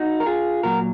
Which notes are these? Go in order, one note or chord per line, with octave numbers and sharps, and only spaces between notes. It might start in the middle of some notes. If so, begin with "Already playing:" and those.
Already playing: D#4 F#4
A#4
F4 G#4
A#2 F#3 F#4 A#4